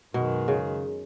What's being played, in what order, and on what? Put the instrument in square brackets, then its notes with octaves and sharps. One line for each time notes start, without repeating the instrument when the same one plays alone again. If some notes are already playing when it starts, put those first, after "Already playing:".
[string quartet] F#2 D#3 G#3 [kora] B2
[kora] C#3